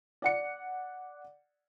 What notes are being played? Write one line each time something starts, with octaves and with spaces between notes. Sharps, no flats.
D5 F#5 C#7